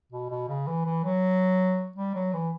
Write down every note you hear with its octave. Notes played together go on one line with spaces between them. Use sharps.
B2
B2
C#3
E3
E3
F#3
G3
F#3
E3